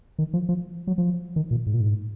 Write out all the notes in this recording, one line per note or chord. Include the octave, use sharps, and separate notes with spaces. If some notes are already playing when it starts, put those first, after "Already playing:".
D#3
F3
F3
F#3
F3
D#3
A#2
G#2
A#2
G#2